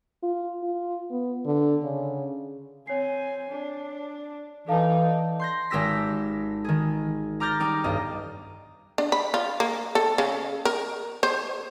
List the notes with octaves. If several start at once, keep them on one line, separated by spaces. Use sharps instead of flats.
F4
F4
B3
D3
C#3
C4 C#5 G#5 C7
D4
E3 D#4 A4 D5 F5 A5
C6 G6 A#6
G#1 G#3 G4 E6 A#6 B6
D#3 G#4
A#5 D6 F6 G6 A6 A#6
G3 D#4 D6
B1 G2 D#5
D4
B5
F4
A#3
A4
C#3
A#4
C5